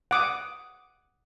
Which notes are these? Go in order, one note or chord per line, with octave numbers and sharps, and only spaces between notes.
F#5 D6 D#6